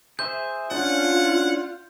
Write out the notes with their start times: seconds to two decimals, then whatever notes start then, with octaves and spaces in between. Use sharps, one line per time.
0.19 G#4 C5 E5 G6
0.71 C#4 D4 F4 F#5